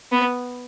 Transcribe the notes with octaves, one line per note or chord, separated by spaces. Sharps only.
B3